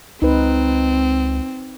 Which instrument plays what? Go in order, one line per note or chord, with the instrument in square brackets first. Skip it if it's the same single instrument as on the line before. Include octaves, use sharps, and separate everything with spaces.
[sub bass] C#2 [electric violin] C4 [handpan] D#4 B4